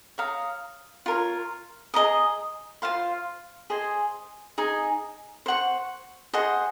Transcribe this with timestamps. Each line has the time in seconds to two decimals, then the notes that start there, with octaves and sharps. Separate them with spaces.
0.18 C#5 F5 A#5 D#6
1.06 F4 A#4 C#5
1.94 G#4 D#5 A#5 D#6
2.82 F4 C5 F5 C6
3.70 G#4 C5 D#5 G#5
4.58 D#4 G#4 D#5 G#5
5.46 C5 F#5 C#6
6.33 G#4 C5 D#5 F#5